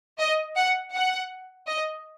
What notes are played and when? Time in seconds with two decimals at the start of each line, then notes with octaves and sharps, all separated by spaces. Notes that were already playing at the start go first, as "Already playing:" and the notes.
0.18 D#5
0.55 F#5
0.93 F#5
1.67 D#5